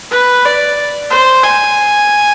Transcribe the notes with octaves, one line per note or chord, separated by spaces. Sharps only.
B4
D5
C5
G#5